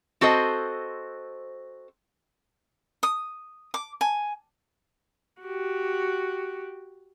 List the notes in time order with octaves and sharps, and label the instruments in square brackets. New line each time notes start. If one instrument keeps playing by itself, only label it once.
[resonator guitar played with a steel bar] C4 F#4 A4 C5 D#5
[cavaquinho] D#6
D6
G#5
[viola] F#4 G4